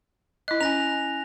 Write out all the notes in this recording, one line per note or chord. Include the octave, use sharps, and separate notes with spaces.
E4 D#5 F#6
C#4 G#5 A#6 F7